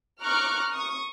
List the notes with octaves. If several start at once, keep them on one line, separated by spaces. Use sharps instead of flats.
A#5 C#6 D6 F6 F#6
C#6 D#6